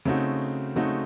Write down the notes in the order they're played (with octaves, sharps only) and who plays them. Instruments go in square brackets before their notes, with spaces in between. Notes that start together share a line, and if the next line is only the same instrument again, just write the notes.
[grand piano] C#3 A3 C4 D#4 F#4
C#3 A3 C4 D#4 F#4